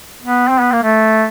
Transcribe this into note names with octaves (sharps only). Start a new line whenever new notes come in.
B3
C4
B3
A#3
A3